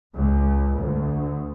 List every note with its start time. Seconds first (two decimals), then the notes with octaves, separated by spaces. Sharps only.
0.15 C#2
0.77 D2